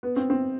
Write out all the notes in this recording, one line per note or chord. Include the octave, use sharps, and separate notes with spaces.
B3
C4
C4